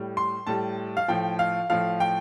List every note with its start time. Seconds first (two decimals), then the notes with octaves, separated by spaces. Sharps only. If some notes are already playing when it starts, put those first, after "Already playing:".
Already playing: A2 G3
0.17 C6
0.47 A2 G3 A5
0.97 F5
1.08 A2 F3 G5
1.39 F5
1.70 A2 F3 F5
2.00 G5